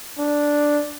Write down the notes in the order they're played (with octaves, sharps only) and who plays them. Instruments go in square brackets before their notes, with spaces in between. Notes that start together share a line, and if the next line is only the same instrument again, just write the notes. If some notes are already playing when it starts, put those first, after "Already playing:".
[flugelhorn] D4